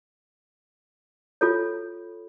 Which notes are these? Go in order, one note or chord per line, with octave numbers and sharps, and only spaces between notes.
F4 A4 C#5